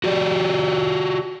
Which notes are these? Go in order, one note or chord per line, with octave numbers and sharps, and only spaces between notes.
F#4 G4 D5